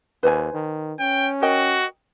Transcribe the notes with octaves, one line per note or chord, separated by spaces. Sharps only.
D#2 B4 C5 G#5
D#3
C#4 G5
F#4 A#4 D#5 G5